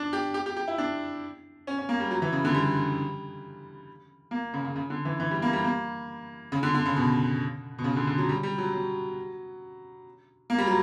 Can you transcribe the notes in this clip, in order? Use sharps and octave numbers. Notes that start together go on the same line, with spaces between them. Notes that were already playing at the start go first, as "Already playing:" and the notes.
Already playing: D4
G4
G4
G4
G4
E4
D4
C#4
C#4
A#3
G3
F#3
E3
C#3
D3
G3
A#3
C#3
C#3
C#3
D3
E3
E3
G3
A#3
G3
A#3
C#3
D3
D3
C#3
B2
B2
C#3
D3
D3
F#3
G3
G3
F#3
F#3
A#3
G3
F#3